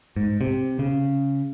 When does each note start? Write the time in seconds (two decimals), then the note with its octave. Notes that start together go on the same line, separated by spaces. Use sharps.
0.16 G#2
0.41 C3
0.79 C#3